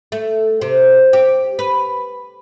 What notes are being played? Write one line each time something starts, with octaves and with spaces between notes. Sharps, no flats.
A3
C3
G4
B4